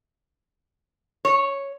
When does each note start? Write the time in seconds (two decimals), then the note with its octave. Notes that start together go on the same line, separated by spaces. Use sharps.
1.25 C#5